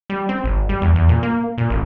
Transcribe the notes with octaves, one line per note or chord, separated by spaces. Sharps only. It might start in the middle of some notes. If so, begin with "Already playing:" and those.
G3
C4
G#1
G3
E2
E2
A#2
A#3
A#2
A1